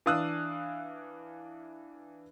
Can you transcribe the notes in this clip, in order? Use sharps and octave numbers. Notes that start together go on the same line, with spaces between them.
E3 D4 F5 D#6 E6 F#6